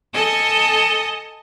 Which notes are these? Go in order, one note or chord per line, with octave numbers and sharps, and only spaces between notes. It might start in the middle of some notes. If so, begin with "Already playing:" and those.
A4 D#5 G#5 A5